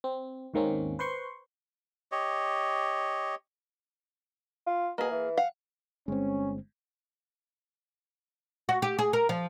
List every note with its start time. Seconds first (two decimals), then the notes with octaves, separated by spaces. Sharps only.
0.04 C4
0.54 D#2 G#2 D#3 A#3 C4 C#4
0.99 B4 C5 C6 C#6
2.12 G4 C#5 D#5
4.67 F4
4.98 B2 A#3 G#4
5.11 E3
5.38 F5 F#5
6.08 G1 G#3 C4 C#4
8.69 F#4
8.82 G4
8.99 G#4
9.13 A#4
9.29 F3